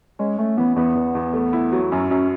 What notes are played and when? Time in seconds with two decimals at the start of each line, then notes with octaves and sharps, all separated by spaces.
0.19 G#3 C#4
0.38 A3 C#4
0.57 E3 B3
0.76 E2 B3
0.95 E2
1.15 E2
1.33 A3
1.53 E4
1.72 F#3
1.91 F#2 C#4
2.10 F#2 C#4